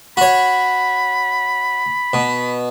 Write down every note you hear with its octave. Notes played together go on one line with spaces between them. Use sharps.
F#4 C#5 B5
B2